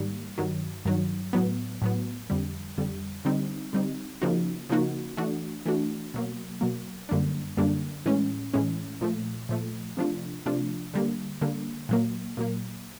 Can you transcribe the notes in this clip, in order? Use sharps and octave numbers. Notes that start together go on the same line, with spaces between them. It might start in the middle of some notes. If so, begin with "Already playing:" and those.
Already playing: G#2 D#3 G3 A#3
G2 D#3 F#3
G2 D#3 F#3
A2 F#3 B3
A2 F#3 B3
F2 D3 G3
F2 D3 G3
D3 G3 C4 D#4
D3 G3 C4 D#4
C#3 F3 A#3 D#4 F#4
C#3 F3 A#3 D#4 F#4
E3 A3 D4 F#4
E3 A3 D4 F#4
B2 F#3 A#3
B2 F#3 A#3
F#2 D3 G3 A#3 D4
F#2 D3 G3 A#3 D4
A2 E3 G#3 C#4
A2 E3 G#3 C#4
A#2 F3 A3
A#2 F3 A3
C3 F3 A3 D4 F4
C3 F3 A3 D4 F4
D3 G3 A#3
D3 G3 A#3
A#2 F#3 A#3
A#2 F#3 A#3